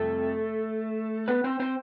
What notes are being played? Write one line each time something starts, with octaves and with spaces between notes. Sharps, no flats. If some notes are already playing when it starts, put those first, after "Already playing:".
Already playing: F2 C3 G3 A3 A4
B3 B4
C4 C5
C4 C5